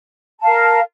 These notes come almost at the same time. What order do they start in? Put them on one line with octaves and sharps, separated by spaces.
A5 F5 A#4